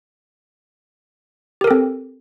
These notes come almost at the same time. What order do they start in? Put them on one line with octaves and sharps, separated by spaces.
G4 A#4 A4 C4